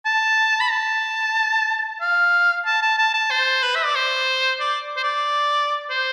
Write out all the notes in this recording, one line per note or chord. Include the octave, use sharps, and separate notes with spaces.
A5
B5
A5
F5
A5
A5
A5
A5
C5
B4
E5
D5
C5
D5
C5
D5
C5